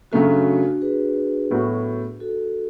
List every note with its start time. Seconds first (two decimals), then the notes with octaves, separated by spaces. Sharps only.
0.12 F#2 C#3 F#3 A3 D4 F#4
0.81 G#4 B4
1.50 A2 F#3 B3 F#4
2.20 F#4 A4